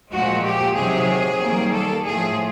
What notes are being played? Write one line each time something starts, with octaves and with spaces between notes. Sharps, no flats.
A#2 F3 G#3 F#4
G4
C3 D#3 F#3 G#4
D#3 G3 A#3
A4
A2 F3 A3 G#4